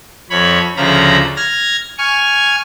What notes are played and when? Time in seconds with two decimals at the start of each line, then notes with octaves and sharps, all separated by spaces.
0.30 F2 C#5 B5
0.77 D2 C#3 F3 A#5 B5
1.37 F6 G#6 A#6
1.98 G#5 C#6 F6